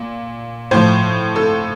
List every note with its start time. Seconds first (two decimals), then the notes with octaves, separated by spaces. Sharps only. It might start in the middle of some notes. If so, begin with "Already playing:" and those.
Already playing: A#2
0.71 A2 F3 C5
1.36 A4